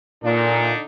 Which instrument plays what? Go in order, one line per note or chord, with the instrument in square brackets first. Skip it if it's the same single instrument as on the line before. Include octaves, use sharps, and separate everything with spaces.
[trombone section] A#2 [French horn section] D3 D4 D#4